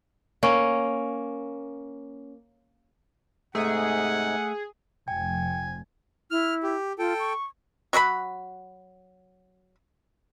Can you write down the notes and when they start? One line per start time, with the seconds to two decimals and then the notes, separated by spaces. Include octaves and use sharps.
0.43 A#3 C#4
3.55 G#2 C3 A3 D#4 G#4 F#5
5.08 F1 F3 G5 G#5
6.31 E4 F6
6.63 G4
6.99 F4 A4 G5
7.19 C#6
7.93 F#3 F#4 A#4 B5